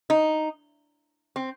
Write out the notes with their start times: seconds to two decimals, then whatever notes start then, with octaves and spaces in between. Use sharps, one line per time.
0.10 D#4
1.36 C4